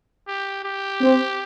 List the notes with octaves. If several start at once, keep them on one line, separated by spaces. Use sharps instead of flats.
G4
G4
C4